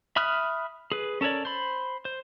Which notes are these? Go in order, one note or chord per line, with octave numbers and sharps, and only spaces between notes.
E5 B5 D#6 F6 F#6
G#4 B4
C#4 A4 A#4 C#5 D5
C5 B5
C5